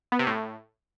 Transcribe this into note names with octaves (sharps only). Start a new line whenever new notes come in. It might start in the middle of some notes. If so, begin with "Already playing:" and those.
B3
C3
A2